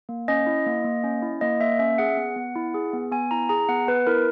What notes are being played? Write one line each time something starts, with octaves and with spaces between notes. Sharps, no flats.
A#3
C#4 D#5
E4
A#3
A#3
C#4
E4
A#3 D#5
A#3 E5
C#4 E5
G#4 F#5
B3
B3
E4
G#4
B3
B3 G#5
E4 A#5
G#4 A#5
B3 F#5
B3 B4
E4 A#4